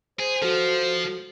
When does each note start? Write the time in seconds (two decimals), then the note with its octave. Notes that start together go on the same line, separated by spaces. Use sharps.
0.19 G#4 C5
0.42 F3 F#4 A4